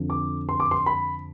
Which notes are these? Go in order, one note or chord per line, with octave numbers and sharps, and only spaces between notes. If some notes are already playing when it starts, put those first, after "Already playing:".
Already playing: F2 D3 F3
D6
C6
D6
C6
B5